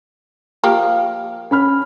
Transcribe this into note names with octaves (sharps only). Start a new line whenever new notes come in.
F3 A#3 G4
C#4 B5 F6